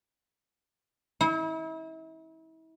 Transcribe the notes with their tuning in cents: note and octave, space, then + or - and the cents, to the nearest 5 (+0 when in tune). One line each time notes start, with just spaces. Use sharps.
E4 -40